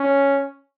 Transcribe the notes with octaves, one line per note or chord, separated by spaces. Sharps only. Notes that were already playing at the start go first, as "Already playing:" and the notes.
Already playing: C#4